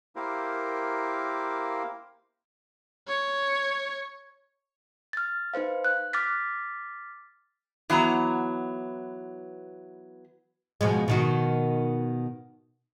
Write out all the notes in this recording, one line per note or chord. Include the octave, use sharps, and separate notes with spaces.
A#3 E4 G4 A#4 C5 F5
C#5
F6 A6
D#4 B4 C5 F5
F#6
D6 F6 A6 B6
E3 F#3 B3 A#5
B2 F3 G#3
B2 D#3 F#4